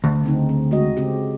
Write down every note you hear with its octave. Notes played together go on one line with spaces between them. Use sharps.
D2
C#3 C4 D#4
C4
G#3 F#4 D#5
C#3 C4 G4